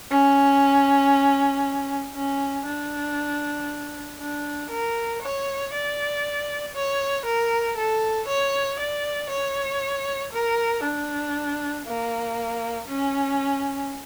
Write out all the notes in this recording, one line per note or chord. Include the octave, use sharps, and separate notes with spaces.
C#4
C#4
D4
D4
A#4
C#5
D5
C#5
A#4
A4
C#5
D5
C#5
A#4
D4
A#3
C#4